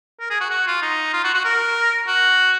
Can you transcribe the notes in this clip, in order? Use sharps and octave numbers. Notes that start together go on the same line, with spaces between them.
A#4
G#4
F#4
F#4
F4
D#4
F4
F#4
F#4
A#4
F#4